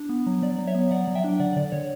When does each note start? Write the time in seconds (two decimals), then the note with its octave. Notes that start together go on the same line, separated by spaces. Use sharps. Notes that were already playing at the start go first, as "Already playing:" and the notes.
Already playing: D4
0.09 B3
0.26 F#3
0.42 F#3 D5
0.58 F#3
0.67 C#5 E5
0.75 B3
0.91 F#3 D5 F#5
1.08 F#3
1.15 E5 G5
1.24 D4
1.40 D3 D5 F#5
1.56 D3 D5
1.72 D3 C#5